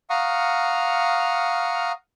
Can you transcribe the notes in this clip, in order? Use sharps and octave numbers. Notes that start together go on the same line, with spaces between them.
F5 F#5 A#5 C#6 D#6 F6